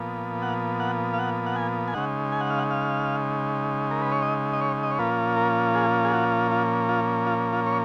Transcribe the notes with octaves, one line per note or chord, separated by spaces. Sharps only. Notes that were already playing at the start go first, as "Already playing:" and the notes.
Already playing: A#2 F3 B3
F#5
F#5
F5
F#5
F#5
G#5
G#5
C#3 G#3 D#4 F#5
G#5
F#5
F5
F#5
F5
A#4
B4
C#5
D#5
D#5
C#5
D#5
C#5
A#2 F3 A#3 C#4 F4 B4
A#4
G#4
G#4
F#4
F4
F4
F4
F4
C#5